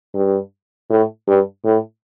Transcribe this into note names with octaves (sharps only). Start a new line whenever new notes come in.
G2
A2
G2
A2